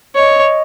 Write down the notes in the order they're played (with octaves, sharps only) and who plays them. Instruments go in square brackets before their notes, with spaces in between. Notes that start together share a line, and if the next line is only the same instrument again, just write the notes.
[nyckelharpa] C#5 [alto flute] D#5